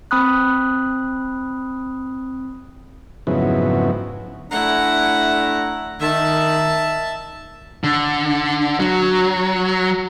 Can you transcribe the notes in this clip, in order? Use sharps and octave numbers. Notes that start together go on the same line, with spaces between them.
C4 B5 D#6 F#6
F2 G#2 C#3 F#3 B3 E4
A3 D4 E4 F#5 A#5
D#3 E5 A5
D3
F#3